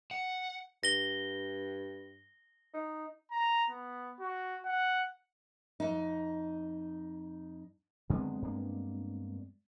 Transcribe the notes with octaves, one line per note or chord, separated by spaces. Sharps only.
F#5
G2 A#6 G7
D#4
A#5
B3
F#4
F#5
F2 D#4
F#2 D3 D#3 G#3 B3 C4
G2 A#3 D4